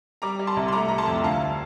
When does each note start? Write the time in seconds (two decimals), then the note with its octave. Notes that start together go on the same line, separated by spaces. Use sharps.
0.22 G3 A#5 D6
0.39 G3
0.47 A5 C6
0.56 C2
0.68 C6
0.73 A3 A#5 D6
0.88 A3 A#5
0.98 A5 C6
1.08 F2
1.23 D2 F5 A5